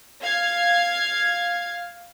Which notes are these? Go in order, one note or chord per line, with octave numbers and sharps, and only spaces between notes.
F5 G#6